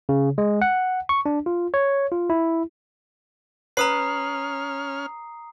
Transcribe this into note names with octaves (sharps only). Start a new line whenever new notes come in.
C#3
G#3
F#5
C#6
D4
F4
C#5
F4
E4
C#4 B4 A#5 D#6 F6 C7